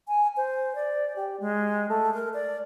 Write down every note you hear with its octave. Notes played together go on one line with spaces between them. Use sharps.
G#5
C5
D5
G4
G#3
A3
A#4
D5